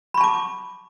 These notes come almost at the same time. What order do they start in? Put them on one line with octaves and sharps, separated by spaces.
B5 C#6 A5 D6